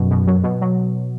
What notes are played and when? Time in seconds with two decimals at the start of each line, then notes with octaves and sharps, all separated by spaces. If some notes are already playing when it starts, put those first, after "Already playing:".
Already playing: F#2 B2
0.11 B2
0.27 F#3
0.44 B2
0.61 F#3